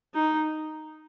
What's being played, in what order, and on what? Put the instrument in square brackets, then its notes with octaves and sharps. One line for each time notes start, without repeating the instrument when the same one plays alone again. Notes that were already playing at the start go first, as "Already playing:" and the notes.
[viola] D#4